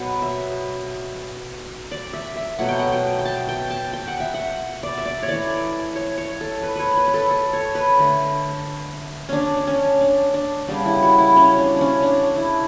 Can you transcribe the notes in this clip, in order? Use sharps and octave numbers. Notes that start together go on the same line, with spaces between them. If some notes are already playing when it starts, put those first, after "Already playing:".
Already playing: B2 F#3 B3 F#5
E5
D5
E5
E5
B2 F#3 A3 F#5
G5
F#5
G5
G5
A5
G5
A5
G5
F#5
E5
F#5
D5
E5
D5
C#5
E3 A3 D5
C#5
C#5
A4
B4
B4 C#5
B4
B4
A4
A4
C#5
B4
D3 A3
C#4 D4
C#4
D4
D4
C#3 G3 B3 D4
E4
F#4
E4
C#4
D4
C#4 D4
D4
E4